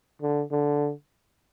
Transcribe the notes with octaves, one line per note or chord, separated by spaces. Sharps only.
D3
D3